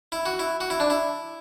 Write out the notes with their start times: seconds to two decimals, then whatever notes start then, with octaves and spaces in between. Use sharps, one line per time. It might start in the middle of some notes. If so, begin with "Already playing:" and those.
0.12 E4
0.26 F#4
0.39 E4
0.61 F#4
0.70 E4
0.80 D4
0.90 E4